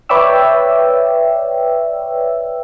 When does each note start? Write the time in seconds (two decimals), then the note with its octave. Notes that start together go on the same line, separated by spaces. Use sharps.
0.09 B4 C#5 D5 E5 G5 E6